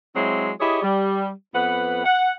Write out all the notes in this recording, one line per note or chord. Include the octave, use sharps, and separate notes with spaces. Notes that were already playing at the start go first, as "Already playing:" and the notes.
F#3 G#3 C4 E4
E4 G4 G#4 C#5 D#5
G3
F2 B3 B4 F#5
F#5